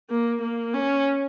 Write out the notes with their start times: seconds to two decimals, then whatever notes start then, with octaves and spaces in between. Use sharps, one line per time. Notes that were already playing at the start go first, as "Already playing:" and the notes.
0.10 A#3
0.42 A#3
0.74 C#4